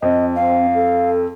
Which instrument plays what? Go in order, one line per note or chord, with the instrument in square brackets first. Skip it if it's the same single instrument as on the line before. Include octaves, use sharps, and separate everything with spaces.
[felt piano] F2 [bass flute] D#5
[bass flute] C4 [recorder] F5
[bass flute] A4